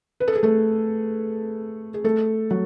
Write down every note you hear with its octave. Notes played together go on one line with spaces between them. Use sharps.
B4
A4
G#4
A3 A4
G#4
A3 A4
F#3 F#4